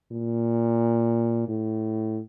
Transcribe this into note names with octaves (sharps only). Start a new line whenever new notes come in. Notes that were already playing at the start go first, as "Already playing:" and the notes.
A#2
A2